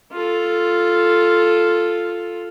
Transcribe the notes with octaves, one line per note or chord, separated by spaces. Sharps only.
F4 A4